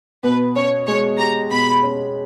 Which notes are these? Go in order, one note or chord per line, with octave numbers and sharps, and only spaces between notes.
B2 B4
C#4 C#5
G#3 C#5
G4 A#5
B2 B5
C#4